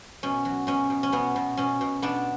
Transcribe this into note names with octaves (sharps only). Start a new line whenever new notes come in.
B2 C#4
F#3
B2 C#4
B2
C#4
B2 B3
B2
B2 C#4
B2
B2 B3 D4